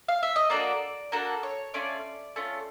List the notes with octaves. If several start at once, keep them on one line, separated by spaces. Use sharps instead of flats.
F5
E5
D#5
A#3 D4 F#4 A4 D5
A#3 D4 F#4 A4
C#5
A3 C#4 F4 D5
A3 C#4 F4